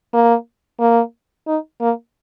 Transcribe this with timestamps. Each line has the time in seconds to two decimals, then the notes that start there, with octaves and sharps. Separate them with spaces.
0.14 A#3
0.80 A#3
1.47 D#4
1.81 A#3